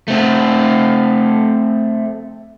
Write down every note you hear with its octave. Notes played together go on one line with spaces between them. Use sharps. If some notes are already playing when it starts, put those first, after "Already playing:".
A3 C4